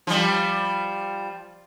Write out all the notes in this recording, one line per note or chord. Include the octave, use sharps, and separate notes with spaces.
F3 G3